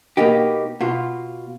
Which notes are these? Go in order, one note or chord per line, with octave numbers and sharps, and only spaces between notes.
B2 A#3 B3 D#4 G4
B2 F4